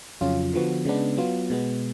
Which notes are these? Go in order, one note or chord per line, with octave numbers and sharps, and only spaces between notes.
F2 C#3 F#3 C#4 F4
D3 F3 B3 F#4
C#3 G#3 B3 D4
F#3 B3 F4
B2 G#3 B3